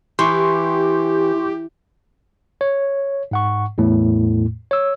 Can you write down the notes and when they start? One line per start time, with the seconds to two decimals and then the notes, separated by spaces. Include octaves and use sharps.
0.19 E3 G4 C6 C#6
2.61 C#5
3.31 G#2 F#5 C#6
3.78 E2 A2 A3
4.71 C#5 E6